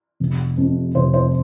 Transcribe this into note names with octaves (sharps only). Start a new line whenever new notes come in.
F1
F2 C3
F1 C5
C5